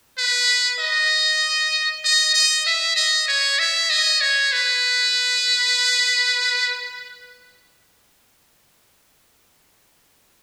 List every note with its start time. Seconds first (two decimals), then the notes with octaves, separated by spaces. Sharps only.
0.18 B4
0.80 D#5
2.04 D#5
2.34 D#5
2.66 E5
2.96 D#5
3.28 C#5
3.59 E5
3.90 D#5
4.21 C#5
4.53 B4